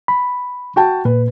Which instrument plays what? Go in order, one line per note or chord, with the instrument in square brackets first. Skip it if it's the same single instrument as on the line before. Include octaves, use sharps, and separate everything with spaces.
[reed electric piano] B5
[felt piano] F#4 G5 A5
[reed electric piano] A#2 [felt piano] B4